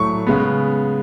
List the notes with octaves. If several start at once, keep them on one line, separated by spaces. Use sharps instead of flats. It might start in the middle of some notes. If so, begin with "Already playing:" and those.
Already playing: A2 F#3 A3 C#6
C#3 G#3 B3